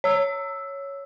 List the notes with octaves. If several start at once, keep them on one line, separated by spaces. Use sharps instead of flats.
C#5 E6